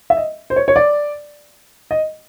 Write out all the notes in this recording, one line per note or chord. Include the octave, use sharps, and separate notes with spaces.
E5
D#5
C5
C#5
C#5
D5
D#5